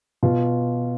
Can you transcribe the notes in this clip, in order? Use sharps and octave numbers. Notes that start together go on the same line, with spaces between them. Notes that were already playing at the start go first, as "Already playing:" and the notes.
B2 F4